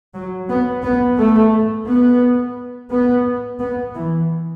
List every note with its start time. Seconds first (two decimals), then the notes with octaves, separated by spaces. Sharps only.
0.14 F#3
0.50 B3
0.83 B3
1.18 A3
1.87 B3
2.91 B3
3.60 B3
3.94 E3